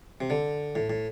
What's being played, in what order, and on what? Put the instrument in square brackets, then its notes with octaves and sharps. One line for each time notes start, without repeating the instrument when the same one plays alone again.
[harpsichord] C3
D3
A2
A2